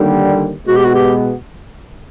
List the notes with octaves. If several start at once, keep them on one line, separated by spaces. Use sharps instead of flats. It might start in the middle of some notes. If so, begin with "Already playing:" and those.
Already playing: D#2 D3 G3
B2 G#3 B3 F#4
G4
F#4
G4